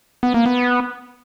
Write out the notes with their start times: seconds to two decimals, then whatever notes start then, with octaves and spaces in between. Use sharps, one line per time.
0.23 B3
0.34 A#3
0.46 B3